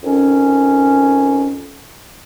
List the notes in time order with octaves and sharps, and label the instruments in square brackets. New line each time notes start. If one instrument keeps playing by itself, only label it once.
[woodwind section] F2 D#3 C#4